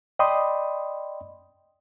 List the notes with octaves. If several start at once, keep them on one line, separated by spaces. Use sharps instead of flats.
D5 D#5 G5 B5 C6 D#6